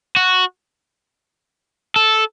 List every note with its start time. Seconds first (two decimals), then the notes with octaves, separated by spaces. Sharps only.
0.17 F#4
1.96 A4